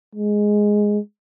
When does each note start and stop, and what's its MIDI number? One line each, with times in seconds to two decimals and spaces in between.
0.15 0.99 56